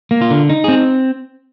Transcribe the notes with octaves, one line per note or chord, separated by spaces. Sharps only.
A#3
F4
D3
D#4
C4 G#4